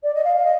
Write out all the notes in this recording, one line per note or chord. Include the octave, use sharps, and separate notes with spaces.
D5
D#5
F5
F5
D#5